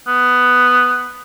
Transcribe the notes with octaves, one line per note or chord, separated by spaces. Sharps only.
B3